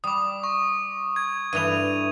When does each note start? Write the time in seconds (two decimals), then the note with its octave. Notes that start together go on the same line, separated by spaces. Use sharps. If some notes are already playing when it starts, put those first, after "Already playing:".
0.04 G3 D6 D#6
0.44 C#6
1.16 G#6
1.53 G2 E3 A3 D#7 F7